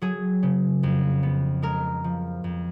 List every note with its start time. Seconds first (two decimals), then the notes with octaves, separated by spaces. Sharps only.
0.02 F#3 G#4
0.43 C#3
0.83 F2
1.23 B3
1.62 G#3 A#4
2.04 F3
2.44 F2